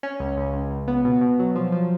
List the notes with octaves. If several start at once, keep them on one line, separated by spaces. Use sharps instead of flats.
C#4
C#2
C#2
C#2
C#2
B3
B2
B2
F#3
F3
F3